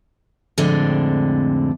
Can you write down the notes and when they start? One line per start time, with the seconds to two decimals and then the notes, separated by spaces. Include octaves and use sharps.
0.58 F2 A2 D3 G#3 C4 D4